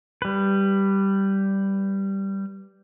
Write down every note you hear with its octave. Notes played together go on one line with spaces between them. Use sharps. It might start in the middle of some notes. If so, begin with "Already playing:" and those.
G3 B4